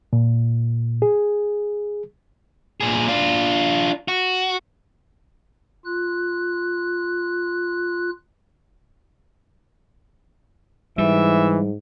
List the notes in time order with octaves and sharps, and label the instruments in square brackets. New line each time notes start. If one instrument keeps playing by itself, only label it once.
[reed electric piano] A#2
G#4
[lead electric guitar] A#2 G#4
D4 F4
F#4
[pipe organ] F4 F#6
[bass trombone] G#2 [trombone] E3 [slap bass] G3 [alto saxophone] E5